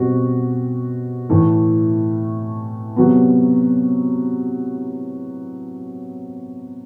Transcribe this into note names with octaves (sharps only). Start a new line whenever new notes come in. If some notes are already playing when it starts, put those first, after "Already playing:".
Already playing: B2 G3 C4 F#4
A2 E3 A3
C3 F#3 B3